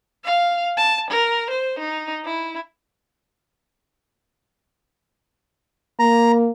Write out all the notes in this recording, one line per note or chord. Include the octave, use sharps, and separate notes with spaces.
F5
A5
A#4
C5
D#4
E4
A#3 A#5